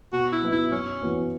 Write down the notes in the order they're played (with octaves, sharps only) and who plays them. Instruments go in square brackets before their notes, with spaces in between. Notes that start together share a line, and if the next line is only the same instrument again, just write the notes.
[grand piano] B2 [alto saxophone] F#4
[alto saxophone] E4
[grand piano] F#3 B3 D#4
[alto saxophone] E4
[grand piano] F#2 [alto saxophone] C#4
[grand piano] E3 B3 F#4